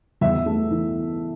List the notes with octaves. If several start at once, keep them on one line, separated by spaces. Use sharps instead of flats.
E2 E5
A3
E3